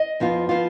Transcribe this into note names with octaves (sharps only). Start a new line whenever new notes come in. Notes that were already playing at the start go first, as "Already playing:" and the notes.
Already playing: D#5
F2 F3 B3 F4
F3 B3 F4